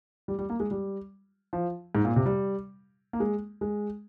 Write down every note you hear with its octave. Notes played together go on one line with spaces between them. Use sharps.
G3
G3
A#3
G#3
G3
F3
G#2
A#2
C3
G3
A#3
G#3
G#3